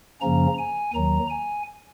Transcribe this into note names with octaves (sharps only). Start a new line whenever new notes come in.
F#2 C#3 F3 A#3 C#4 A#5
G#5
D#2 D#3 F#3 A#5
G#5